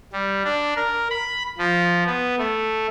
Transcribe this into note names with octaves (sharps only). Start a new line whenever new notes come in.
G3
D4
A#4
B5
F3
B3
A3